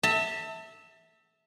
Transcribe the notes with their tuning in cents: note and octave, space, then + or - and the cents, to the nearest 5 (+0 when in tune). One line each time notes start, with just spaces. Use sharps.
E5 -15 A5 +30